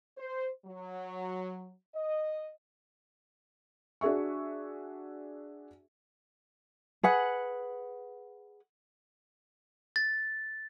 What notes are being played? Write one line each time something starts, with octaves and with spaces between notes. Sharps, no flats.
C5
F#3
D#5
D4 F#4 G#4 E5 C#6
G#4 B4 F#5
A6